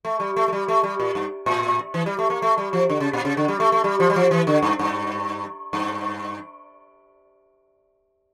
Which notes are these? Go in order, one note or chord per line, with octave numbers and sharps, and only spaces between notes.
A3
G3
A3
A3
G3
A3
G3
A#2
G2
A2
E3
G3
A3
A#3
A3
G3
F3
D3
C#3
A#2
C#3
D3
G3
A3
A3
G3
F3
G3
F3
E3
D3
G2
G2
G2